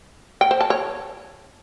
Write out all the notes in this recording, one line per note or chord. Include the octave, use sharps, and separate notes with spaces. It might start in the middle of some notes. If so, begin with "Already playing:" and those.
G5
C5
A5
C#5